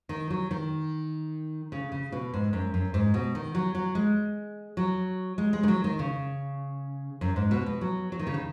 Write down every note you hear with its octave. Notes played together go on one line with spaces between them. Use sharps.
D#3
F#3
D#3
C#3
C#3
B2
G#2
F#2
F#2
G#2
B2
D#3
F#3
F#3
G#3
F#3
G#3
G#3
D#3
F#3
D#3
C#3
F#2
G#2
B2
B2
F#3
F#3
D#3
C#3
D#3